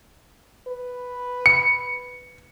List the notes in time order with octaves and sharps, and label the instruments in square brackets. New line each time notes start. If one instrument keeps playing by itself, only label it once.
[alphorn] B4
[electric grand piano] C#7